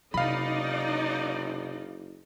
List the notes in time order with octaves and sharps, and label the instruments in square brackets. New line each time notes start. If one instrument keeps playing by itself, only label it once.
[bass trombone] F#1 [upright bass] C3 [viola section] D#4 D5 D#5 [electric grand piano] F5 B5